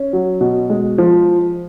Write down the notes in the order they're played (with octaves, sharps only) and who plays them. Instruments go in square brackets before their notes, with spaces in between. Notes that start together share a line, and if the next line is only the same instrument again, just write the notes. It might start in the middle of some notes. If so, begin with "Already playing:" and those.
Already playing: [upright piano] C#4
F#3
B2
G#3
F3